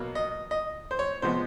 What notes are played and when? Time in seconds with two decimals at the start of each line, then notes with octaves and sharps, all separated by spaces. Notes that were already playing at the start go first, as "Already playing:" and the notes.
Already playing: B2 F#3 A#3
0.15 D#5
0.51 D#5
0.91 C5
0.99 C#5
1.22 C3 F3 G#3 B3 C5